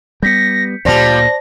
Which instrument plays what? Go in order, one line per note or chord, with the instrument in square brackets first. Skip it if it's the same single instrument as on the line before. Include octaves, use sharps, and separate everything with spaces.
[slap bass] G3 B3 [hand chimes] G6 B6 C#7 [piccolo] A#6
[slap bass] D2 A#2 [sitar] F3 G3 [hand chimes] C5 D5 A5 [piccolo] A#6